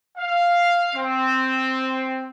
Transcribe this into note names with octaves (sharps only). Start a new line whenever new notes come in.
F5
C4